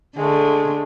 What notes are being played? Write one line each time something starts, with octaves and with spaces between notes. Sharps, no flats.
D3 G#3 A3